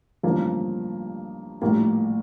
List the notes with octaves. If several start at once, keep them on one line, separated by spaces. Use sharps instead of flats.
A1 G2 D3 F3 A#3
A#1 A2 G3 A#3